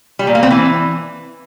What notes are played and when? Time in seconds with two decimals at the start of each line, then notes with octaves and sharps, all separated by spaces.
0.19 G3
0.27 A#2
0.35 A#3
0.43 C4
0.50 E3